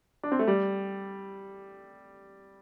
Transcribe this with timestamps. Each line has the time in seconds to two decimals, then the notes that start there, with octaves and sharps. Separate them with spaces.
0.23 D4
0.32 C4
0.39 A3
0.47 G3